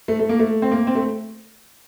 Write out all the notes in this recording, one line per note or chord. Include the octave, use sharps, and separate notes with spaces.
A3
A3
A#3
A3
C4
A#3
C4
A3